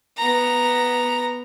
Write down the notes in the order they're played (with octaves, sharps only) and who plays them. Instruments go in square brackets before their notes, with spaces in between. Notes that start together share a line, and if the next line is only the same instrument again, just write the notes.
[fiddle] B3 A#5